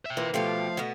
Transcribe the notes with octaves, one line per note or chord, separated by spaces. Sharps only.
E5 G5
E3 A#3 F4
B2 F3 A3 F4 G4 F5
B2 B3 F#4